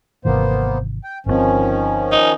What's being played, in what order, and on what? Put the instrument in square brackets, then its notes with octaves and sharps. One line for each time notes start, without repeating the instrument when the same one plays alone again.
[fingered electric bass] G#1 C3 E3 [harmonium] A#3 B3 C5
[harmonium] G5
[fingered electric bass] G1 A#2 C4 [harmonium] D#3 F3 C#4
[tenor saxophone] D#4